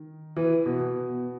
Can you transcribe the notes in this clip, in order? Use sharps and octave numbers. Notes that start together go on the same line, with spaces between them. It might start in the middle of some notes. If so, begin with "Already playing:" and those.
Already playing: D#3
E3
B2
B2